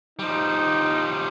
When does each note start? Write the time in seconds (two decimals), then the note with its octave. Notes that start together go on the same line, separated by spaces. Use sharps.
0.19 F3 G3 D#4